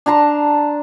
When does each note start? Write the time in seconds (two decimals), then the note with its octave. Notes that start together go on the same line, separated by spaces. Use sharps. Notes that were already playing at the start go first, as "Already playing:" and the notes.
0.06 D4 A5 A#5 C6